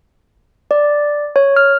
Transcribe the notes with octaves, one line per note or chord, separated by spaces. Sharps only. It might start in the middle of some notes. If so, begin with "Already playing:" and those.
D5
C#5
F6